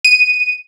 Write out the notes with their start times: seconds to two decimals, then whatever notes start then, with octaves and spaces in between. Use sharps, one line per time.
0.05 D#7